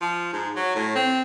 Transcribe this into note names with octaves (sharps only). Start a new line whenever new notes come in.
F3
G#2
F#3
A2
C4